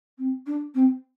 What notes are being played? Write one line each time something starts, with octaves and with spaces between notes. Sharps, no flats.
C4
D4
C4